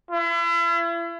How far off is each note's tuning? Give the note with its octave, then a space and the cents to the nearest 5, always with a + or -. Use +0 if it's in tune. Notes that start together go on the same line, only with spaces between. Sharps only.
E4 +40